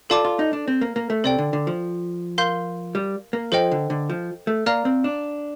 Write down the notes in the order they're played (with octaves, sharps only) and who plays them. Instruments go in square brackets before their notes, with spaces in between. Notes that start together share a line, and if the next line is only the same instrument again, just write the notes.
[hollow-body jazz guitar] F4 [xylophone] A4 D5 A5 D6
[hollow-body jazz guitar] F4
D#4
D4
C4
A#3
A#3
A3
[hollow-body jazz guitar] C3 [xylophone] A4 D5 G5
[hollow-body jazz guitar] D3
D3
F3
[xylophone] A#4 F5 C6 G6
[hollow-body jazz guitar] G3
A#3
[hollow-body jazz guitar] F3 [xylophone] A4 C5 D#5 G5
[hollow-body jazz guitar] D3
D3
F3
A3
[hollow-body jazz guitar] A#3 [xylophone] D5 F5 A#5 F6
[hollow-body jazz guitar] C4
D4